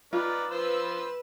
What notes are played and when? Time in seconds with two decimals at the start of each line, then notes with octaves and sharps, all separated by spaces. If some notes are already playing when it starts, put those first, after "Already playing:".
0.13 D#4 F4 B4 D5
0.51 F3 B4 C5 E6